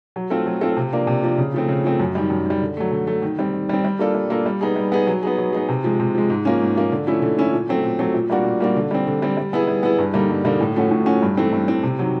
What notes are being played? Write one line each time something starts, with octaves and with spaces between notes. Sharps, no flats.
F#3
A3 C4 F4 A4
F#3
A3 C4 F4 A4
C3
F3 A#3 D4
C3
F3 A#3 D4
C#3
F3 A3 C4
C#3
F3 A3 C4
F#2
D#3 G3
F#2
D#3 G3
D3
F#3 A3
D3
F#3 A3
D#3
G3 C4
D#3
G3 C4
G3
A#3 D4 F4 A4
G3
A#3 D4 F4 A4
G3
B3 D#4 G#4
G3
B3 D#4 G#4
F#3
B3 D#4 G#4
F#3
B3 D#4 G#4
C3
F3 G#3
C3
F3 G#3
G#2
F3 A#3 C#4
G#2
F3 A#3 C#4
D3
F3 A3 C#4 E4
D3
F3 A3 C#4 E4
A#2
F#3 A3 C4
A#2
F#3 A3 C4
A#2
G3 A#3 D4 F#4
A#2
G3 A#3 D4 F#4
D3
G3 C4
D3
G3 C4
G3
B3 E4 G#4
G3
B3 E4 G#4
G2
D3 G3 A#3 D#4
G2
D3 G3 A#3 D#4
A2
F3 A3 C#4 F#4
A2
F3 A3 C#4 F#4
G2
E3 A3 C4
G2
E3 A3 C4
C3
D#3 F#3